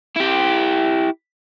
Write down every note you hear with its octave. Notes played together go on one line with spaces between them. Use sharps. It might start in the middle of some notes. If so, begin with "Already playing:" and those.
E4 G4